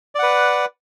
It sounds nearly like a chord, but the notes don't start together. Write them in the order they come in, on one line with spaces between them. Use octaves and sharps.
D5 F#5 B4